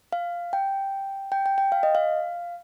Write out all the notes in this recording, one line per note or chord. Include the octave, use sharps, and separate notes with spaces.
F5
G5
G5
G5
G5
F5
D#5
F5